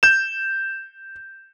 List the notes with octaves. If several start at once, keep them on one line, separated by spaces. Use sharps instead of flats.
G6 E7